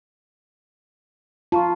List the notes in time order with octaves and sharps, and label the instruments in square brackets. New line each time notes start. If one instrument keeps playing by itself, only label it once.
[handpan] F4 [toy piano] A5 A#5 C#6